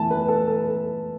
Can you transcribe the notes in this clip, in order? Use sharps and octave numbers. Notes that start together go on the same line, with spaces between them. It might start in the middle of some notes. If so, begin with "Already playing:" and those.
Already playing: E2 E3 A3 A5
B4
A4
A4